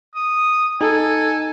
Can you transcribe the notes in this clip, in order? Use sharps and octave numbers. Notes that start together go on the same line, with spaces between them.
D#6
D#4 A4 G#5